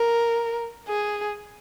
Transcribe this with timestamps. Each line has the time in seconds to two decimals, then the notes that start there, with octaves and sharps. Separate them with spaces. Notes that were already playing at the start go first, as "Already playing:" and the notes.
Already playing: A#4
0.88 G#4